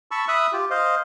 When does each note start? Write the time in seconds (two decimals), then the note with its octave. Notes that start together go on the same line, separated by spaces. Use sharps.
0.11 A5 B5 C#6 E6
0.28 E5 B5 D#6 E6 F#6
0.53 F4 G4
0.70 C5 D#5 F5